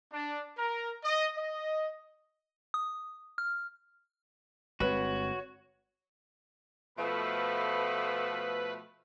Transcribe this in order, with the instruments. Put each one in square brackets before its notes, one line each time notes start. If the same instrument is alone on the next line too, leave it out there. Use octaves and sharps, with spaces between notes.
[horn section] D4
A#4
D#5
D#5
[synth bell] D#6
F6
[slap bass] G1 G#3 C4 [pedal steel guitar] F#4 [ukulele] B4 [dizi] C#5
[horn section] B2 F3 A3 [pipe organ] B4